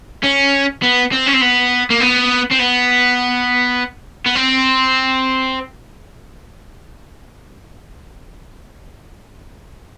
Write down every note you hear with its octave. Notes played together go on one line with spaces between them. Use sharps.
C#4
B3
C4
C#4
C4
B3
A#3
B3
C4
B3
B3
C4